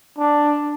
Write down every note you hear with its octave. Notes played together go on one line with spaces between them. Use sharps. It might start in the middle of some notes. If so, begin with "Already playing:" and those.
D4